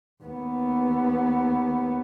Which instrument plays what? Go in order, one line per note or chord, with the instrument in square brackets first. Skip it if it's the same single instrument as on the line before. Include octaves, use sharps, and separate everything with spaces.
[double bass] D#2 B3